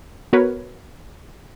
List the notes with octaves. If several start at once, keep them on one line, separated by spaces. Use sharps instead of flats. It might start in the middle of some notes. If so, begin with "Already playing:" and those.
B3 F#4 A#4 B4 C#5